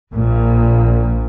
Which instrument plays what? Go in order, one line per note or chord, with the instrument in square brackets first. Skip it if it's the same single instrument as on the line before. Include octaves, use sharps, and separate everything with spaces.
[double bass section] A#1 A#2